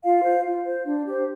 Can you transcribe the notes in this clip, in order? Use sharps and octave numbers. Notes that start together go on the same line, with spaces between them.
F4 F5
C5
F4
C5
D4
G4 C5